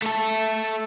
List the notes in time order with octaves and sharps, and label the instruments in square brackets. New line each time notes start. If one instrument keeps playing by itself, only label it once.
[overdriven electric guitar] A3 A4